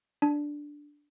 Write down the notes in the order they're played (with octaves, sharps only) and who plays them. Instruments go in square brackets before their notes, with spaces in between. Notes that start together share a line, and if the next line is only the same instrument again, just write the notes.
[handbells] D4